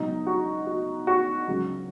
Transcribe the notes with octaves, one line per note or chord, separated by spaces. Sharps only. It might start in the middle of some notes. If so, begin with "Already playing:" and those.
Already playing: C#2 B2 F#3 D#4
F#4
F#4
F#4
C#2 C#3 F#3